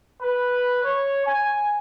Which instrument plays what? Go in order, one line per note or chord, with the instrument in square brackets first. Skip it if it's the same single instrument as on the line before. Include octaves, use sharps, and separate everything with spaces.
[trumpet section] B4
C#5
G#5